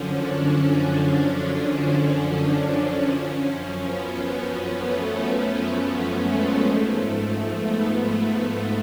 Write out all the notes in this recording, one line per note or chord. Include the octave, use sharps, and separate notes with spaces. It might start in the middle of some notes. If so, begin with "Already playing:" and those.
Already playing: F#2 D3 F3 C#4
D4
C#4
F#2 F3
B3
A3
A3
G#3
G#2 F3 A3
B3